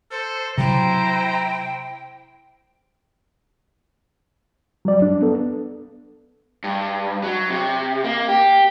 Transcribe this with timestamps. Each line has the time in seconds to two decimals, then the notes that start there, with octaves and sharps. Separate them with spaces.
0.11 A4 C5
0.58 C3 F#3 E4 C5 G5 A#5
4.85 F#3 G3 D5
5.02 D4
5.22 B3 A4
6.64 G2
7.23 F#3
7.50 C3
8.04 A#3
8.29 G4